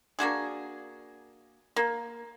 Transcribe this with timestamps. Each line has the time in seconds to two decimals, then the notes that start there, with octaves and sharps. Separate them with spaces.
0.19 A#3 D4 F#4 G#4
1.76 A#3